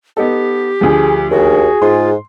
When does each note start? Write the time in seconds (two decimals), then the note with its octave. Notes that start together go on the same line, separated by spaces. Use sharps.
0.17 B3 D#4 G4 A4
0.81 D2 D3 F3 G#4
1.31 D#2 F#4 G#4
1.82 G#2 F4 C6